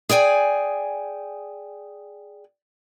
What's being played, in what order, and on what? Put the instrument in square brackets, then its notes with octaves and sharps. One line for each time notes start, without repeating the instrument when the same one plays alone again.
[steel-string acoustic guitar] G#4 D5 G5 G#5